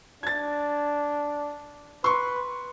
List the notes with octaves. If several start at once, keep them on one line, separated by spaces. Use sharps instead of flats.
D4 G#6 A6
B4 C6 C#6